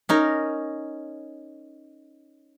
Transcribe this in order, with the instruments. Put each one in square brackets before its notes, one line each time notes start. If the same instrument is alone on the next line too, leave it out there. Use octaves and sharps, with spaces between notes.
[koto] C#4 D#4 A#4